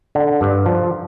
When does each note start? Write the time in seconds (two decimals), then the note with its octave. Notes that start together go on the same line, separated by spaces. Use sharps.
0.15 D3
0.41 G2
0.66 F3